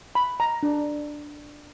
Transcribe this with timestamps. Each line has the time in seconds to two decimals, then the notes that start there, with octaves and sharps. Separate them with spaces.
0.15 B5
0.40 A#5
0.63 D4